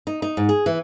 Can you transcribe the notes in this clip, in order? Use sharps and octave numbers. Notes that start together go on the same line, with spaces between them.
D#4
D#4
G#2
G#4
E3